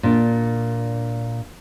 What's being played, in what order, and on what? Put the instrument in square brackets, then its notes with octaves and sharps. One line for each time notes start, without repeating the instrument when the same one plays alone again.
[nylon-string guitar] A#2 D4